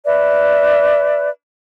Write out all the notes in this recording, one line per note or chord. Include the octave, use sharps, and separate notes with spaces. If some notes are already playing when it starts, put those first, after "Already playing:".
B4 D5 E5